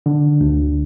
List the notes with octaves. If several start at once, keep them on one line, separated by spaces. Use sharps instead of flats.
D3
D2